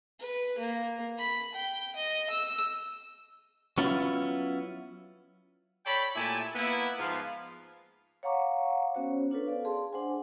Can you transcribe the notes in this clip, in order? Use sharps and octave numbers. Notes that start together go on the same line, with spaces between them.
B4
A#3
B5
G5
D#5
E6
F#3 B3 C#4 E4 F4
A4 C#5 D5 G5 B5
A#2 A3 E4 G4 G#5 A5
A#3 B3 E4
G#2 F3 B3 F4 F5
C#5 F5 F#5 A#5 C#6 D6
B3 C#4 F#4 C5 C#5
D4 F4 A4 B4
A4 D5 F5
G#4 A5 C6
D4 C5 F#5 G#5